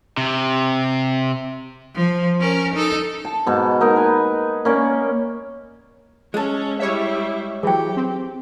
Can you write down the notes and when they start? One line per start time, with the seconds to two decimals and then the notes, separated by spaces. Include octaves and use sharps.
0.17 C3
1.94 F3
2.40 C#4 A#4
2.74 D#4 A4
3.25 A5
3.46 G#2 B2
3.81 A#3 D#4 A#4
3.96 B4 G#5
4.65 A#3 C#4 D5
6.34 G#3 C#4 A4 C#5
6.80 G3 E4 C#5 E5
7.63 E3 F#3 G4 G#4 G5
7.97 C4